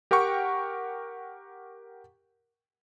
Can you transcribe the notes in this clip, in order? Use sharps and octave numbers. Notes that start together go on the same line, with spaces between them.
G4 A#4 F#5 G5 C#6